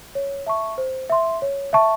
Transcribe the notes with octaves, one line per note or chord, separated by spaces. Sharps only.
C#5
E5 A5 C#6
C5
E5 C6
C#5
E5 A5 C#6